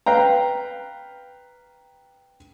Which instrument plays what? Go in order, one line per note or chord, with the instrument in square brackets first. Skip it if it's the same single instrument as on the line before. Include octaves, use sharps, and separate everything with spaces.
[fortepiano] B4 F5 G5 A#5